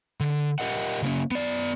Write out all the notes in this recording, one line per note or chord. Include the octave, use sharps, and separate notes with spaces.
D3
G4 A#4 D#5 F#5
C#3 A#3 C#4
B3 D5